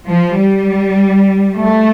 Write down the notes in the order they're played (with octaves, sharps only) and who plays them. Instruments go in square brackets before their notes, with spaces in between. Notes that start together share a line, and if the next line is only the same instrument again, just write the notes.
[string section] F3
G3
A3